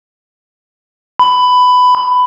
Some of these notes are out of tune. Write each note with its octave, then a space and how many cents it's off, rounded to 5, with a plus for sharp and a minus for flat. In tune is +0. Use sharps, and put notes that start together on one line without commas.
B5 +15